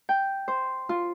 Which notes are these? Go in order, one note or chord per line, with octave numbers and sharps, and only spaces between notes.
G5
C5
F4